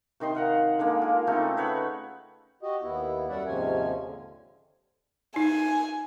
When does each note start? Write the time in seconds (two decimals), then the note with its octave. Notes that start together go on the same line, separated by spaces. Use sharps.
0.20 C3 D#3 D#5 C6
0.35 F5 F#5 A#5
0.79 D3 G#3 A#3
1.02 F4 A#4
1.27 C#3 A3 C4 D#4
1.57 B4 C#5 F#5 B5
2.63 F#4 G4 D#5
2.82 D#2 B3 E4
3.29 F#2 G3 C#4 D5 E5 F#5
3.47 D#2 G#2 C3 F3 C#4 G#5
4.05 D3
5.36 D#4 G#5